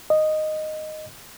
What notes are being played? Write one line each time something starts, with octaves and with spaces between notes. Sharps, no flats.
D#5